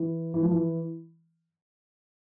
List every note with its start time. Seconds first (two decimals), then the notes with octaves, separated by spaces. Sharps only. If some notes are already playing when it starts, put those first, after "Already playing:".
Already playing: E3
0.34 E3
0.42 F3
0.51 E3